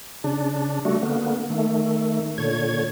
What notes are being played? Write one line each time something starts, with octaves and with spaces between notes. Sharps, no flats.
C#3 D4
G3 A3 F#4
D3 A#3 B3
D#3 A3
A#2 D3 C#5 G#6